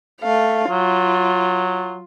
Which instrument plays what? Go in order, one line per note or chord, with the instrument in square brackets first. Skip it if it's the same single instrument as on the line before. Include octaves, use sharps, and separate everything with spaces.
[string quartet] A3 F5
[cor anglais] F#3 [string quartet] F4